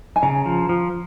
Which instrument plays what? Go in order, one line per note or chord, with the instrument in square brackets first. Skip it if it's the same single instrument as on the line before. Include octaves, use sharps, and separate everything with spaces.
[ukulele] G#5
[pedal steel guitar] C#3 [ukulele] A#5
[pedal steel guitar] F3
F3